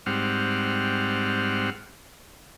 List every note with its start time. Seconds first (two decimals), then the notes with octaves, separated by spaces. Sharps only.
0.06 G#2 G3 C4 F#5 F6